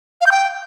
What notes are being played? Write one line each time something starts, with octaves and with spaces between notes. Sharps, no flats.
F5
G6
G5